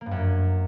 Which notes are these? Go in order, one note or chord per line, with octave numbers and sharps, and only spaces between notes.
A#3
G2
F#2
A#3